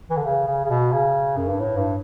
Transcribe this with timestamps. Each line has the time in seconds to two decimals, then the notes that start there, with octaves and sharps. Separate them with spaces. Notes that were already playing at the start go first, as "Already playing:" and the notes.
0.10 E3
0.17 D3
0.25 C#3
0.47 C#3
0.65 C#3
0.69 B2
0.93 C#3
1.37 F#2
1.48 G2
1.60 A2
1.77 G2